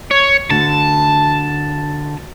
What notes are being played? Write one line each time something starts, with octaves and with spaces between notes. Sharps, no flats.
C#5
D2 D3 A5